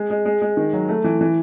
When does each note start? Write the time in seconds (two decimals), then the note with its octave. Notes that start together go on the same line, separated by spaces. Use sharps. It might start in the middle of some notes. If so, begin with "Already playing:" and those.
Already playing: G#3
0.10 G#3
0.25 G#3
0.42 G#3
0.57 D#3
0.73 F#3
0.89 A3
1.04 E3
1.21 E3